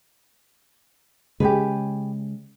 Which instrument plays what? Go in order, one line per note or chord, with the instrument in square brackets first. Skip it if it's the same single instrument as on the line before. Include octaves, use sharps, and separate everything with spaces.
[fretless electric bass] C#3 G#3 [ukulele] G4 G#4 B4